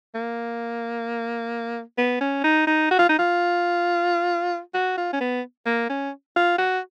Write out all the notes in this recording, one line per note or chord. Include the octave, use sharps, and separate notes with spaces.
A#3
B3
C#4
D#4
D#4
F#4
F4
D#4
F4
F#4
F4
C#4
B3
A#3
C#4
F4
F#4